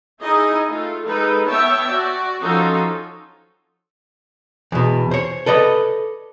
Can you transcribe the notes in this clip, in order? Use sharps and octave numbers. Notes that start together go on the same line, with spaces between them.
D#4 E4 G#4 D#5
A3 F4 A4
G#3 D#4 A4 B4
B3 C#5 E5 G5 A5
F#4 D5
F3 C#4 D#4 F4 F#4 A4
E2 B2
C5 C#5
A4 B4 D5 D#5